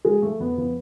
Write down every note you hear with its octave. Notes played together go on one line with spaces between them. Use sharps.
F3 G#3
F3 A3
F2 B3
F3 B3